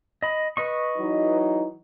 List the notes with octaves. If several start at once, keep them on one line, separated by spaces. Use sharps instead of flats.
D#5 B5
B4 D#5 C#6
E3 F#3 D#4